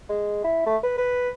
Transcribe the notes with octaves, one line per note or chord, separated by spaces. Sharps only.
G#3
E4
A3
B4
B4